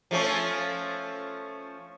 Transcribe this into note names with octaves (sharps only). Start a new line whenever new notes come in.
F3 A3 C#4